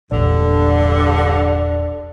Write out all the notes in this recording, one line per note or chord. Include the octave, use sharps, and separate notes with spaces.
E1 A#1 G2 D3 D4